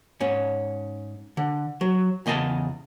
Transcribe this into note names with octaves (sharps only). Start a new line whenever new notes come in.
G#2 C#4
D3
F#3
E2 C#3 D#5 G#5 A5